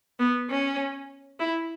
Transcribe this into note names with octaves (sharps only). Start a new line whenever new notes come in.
B3
C#4
E4